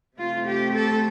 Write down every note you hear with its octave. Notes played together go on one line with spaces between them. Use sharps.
C3 A3 C4 F4
G4
A4